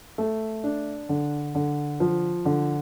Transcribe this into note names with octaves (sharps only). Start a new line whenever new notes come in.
A3
D4
D3
D3
F3
D3